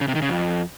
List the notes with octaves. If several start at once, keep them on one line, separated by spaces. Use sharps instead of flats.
C#3
C3
D#3
C#3
F2